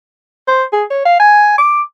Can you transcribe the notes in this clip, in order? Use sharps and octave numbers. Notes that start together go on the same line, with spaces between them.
C5
G#4
C#5
F5
G#5
D6